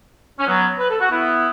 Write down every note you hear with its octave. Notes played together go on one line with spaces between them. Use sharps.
C#4
F#3 B3
B4
A4
F#4
B3 E4